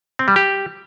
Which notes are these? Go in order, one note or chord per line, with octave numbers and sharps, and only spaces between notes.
C4
G3
G4